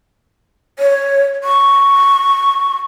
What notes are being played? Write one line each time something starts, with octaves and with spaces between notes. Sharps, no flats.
C#5
C#6